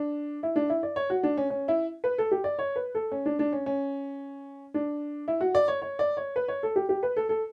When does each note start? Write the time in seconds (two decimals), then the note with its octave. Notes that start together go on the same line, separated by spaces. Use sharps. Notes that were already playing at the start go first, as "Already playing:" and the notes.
Already playing: D4
0.43 E4
0.56 D4
0.70 E4
0.83 D5
0.96 C#5
1.10 F#4
1.23 D4
1.37 C#4
1.50 C#4
1.68 E4
2.04 B4
2.18 A4
2.32 G4
2.44 D5
2.59 C#5
2.76 B4
2.95 A4
3.12 C#4
3.26 D4
3.39 D4
3.53 C#4
3.66 C#4
4.74 D4
5.28 E4
5.41 F#4
5.55 D5
5.68 C#5
5.82 C#5
5.99 D5
6.17 C#5
6.36 B4
6.48 C#5
6.63 A4
6.76 G4
6.89 G4
7.03 B4
7.16 A4
7.29 A4